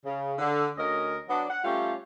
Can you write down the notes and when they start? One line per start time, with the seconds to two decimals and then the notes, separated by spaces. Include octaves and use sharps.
0.05 C#3
0.38 D3
0.76 D2 C#4 A#4 D#5
1.29 F#3 B3 D4
1.49 F#5
1.64 G3 A3 C#4 F4 G4